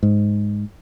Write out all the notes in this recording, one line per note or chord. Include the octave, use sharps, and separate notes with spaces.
G#2